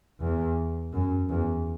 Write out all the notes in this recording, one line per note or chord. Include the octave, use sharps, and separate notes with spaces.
E2
F#2
E2